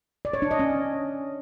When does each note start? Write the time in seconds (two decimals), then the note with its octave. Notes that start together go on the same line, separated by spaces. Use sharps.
0.25 D5
0.33 C#5
0.42 D4
0.51 D#5
0.59 C#4